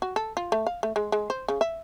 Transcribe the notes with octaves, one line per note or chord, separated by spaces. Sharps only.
F#4
A4
F4
A3
F5
A3
G#3
G#3
C5
C#3
E5